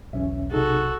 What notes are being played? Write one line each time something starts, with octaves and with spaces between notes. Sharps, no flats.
B1 E2 C#4 E5
C3 D#4 F#4 G#4 A4